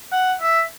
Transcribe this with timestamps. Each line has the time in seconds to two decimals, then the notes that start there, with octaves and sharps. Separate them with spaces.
0.12 F#5
0.41 E5